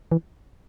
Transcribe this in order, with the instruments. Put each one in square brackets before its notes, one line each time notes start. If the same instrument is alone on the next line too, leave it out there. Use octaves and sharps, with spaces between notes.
[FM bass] E3